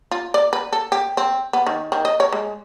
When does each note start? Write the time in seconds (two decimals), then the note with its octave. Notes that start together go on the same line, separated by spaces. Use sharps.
0.11 F4
0.34 D5
0.53 B4
0.73 A4
0.92 G4
1.17 C4
1.53 B3
1.66 D#3
1.92 D#3
2.05 D#5
2.20 C#5
2.32 G#3